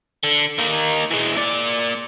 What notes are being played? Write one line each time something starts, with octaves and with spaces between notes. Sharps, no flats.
D3
A#3 D#4
E3 G#3
A#3 D5